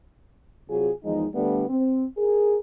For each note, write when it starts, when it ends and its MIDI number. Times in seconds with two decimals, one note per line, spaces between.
0.69 0.90 48
0.69 0.90 54
0.69 0.90 65
0.69 0.90 68
1.04 1.25 40
1.04 1.25 51
1.04 1.25 53
1.04 1.25 56
1.04 1.25 63
1.34 1.64 50
1.34 1.64 55
1.34 1.64 57
1.34 1.64 59
1.34 1.64 62
1.34 1.64 69
1.69 2.05 60
2.17 2.57 68
2.17 2.57 70